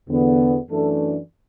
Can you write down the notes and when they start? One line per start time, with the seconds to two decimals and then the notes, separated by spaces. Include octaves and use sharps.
0.08 E2 D3 B3
0.69 F#2 E3 A3 D4 A4